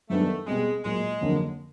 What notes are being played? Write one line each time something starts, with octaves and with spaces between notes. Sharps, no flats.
F#2 D#3 G3 A3 B3 D4
B2 G3 G#3 C4
A#2 F#3 G#3 A#3
F2 D3 F#3 A#3 C#4